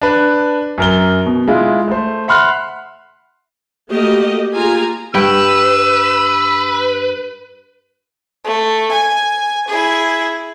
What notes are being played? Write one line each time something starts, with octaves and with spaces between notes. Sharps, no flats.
D4 B4
F#2 A#4 G7
B2
G#3 E4 F4
A3 C5
E5 F#5 B5 C6 F6 F#6
A3 A#3 F#4 G4 D#5
A#3 F4 G4 G#4 G#5 A#5
G2 B4 G5 E6
A3
G#5
E4 G#4